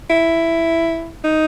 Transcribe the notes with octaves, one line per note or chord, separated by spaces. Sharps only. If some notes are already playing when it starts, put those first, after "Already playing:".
E4
D#4